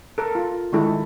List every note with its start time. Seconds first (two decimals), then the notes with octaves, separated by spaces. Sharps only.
0.18 A4 A#4
0.35 F4
0.73 D#3 G#3 D4 E4 A4